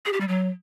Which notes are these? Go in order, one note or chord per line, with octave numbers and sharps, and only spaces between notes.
G#4
G4
G3
F#3